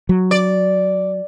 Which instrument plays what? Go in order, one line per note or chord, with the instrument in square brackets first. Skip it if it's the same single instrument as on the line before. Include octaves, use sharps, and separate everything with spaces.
[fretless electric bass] F#3
[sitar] D5